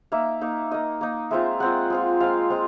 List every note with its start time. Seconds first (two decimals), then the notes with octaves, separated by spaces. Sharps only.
0.12 A#3 D#4 E5
0.41 A#3 D#4
0.71 A#3 D#4 D#5
1.01 A#3 D#4
1.31 G#3 C4 F4 E5
1.60 G#3 C4 F4 F#5
1.90 G#3 C4 F4
2.20 G#3 C4 F4 F5
2.50 G#3 C4 F4